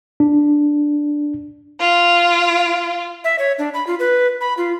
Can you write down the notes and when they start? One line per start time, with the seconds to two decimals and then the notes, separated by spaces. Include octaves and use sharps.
0.20 D4
1.79 F4
3.24 E5
3.39 C#5
3.59 D4
3.74 B5
3.87 F4
3.99 B4
4.41 B5
4.58 F4